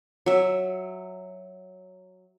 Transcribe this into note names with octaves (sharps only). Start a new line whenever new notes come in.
F#3 E5